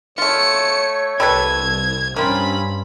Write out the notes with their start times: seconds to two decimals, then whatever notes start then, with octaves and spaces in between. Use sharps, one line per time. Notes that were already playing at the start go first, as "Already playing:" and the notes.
0.18 A3 F4 C#5 C#7
1.20 C2 G3 A4 B4 G#6
2.16 G2 A#3 C4 C#4 F4 B5